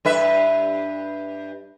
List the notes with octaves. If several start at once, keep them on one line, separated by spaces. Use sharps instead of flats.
G2 B4 E5